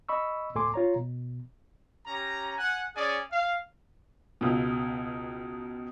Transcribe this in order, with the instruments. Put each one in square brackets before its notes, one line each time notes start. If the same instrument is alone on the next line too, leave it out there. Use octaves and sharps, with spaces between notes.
[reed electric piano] D#5 B5 C#6 E6
D2 A2 A4 G#5 C6 D6
F4 C#5 A#5
B2
[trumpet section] C#4 G4 A#5
F#5 G#5
C#4 G#4 D5 G#5
F5
[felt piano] C#2 B2